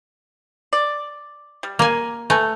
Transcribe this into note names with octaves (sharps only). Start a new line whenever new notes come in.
D5
G3
A#3 G#5
A3 B4 G#5 A#5